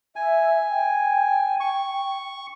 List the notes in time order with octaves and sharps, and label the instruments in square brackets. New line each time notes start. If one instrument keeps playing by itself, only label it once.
[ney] E5 [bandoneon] G#5
[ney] G5
[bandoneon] C#6